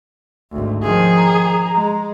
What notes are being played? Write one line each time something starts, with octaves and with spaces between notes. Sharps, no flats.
G#1 D2
D#3 F3 G#4
A#5
G#3